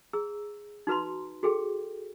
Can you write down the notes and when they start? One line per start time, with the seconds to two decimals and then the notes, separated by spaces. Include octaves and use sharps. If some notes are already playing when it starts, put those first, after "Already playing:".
0.13 G#4 A#5 E6
0.87 D#4 F#4 B4 A#5 C6
1.43 F#4 G#4 A4 G5